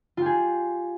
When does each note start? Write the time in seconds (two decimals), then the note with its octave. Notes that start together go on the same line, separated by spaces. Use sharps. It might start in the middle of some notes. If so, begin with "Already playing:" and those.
0.17 F4
0.22 G4
0.26 G#4